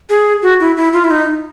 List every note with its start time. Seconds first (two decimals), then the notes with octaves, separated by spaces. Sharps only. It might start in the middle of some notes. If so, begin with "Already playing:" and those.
0.10 G#4
0.42 F#4
0.60 E4
0.77 E4
0.93 F4
1.04 E4
1.10 D#4